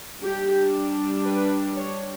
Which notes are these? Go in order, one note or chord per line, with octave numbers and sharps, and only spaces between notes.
G3 D4 G4
B4
C#5